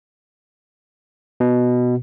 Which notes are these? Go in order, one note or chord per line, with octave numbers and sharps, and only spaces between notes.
B2